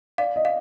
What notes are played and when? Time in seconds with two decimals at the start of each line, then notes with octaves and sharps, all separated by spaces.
0.18 D5 F5
0.36 D#5
0.45 F5